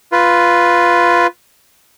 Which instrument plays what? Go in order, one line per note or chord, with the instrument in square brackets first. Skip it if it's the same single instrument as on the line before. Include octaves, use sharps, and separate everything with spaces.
[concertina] F4 B4